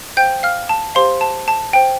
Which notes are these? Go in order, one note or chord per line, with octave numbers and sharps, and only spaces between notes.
C5 F5 G5 G6
F5 F6
A5
G4 C5 F5 C6
A5
A5
C5 G5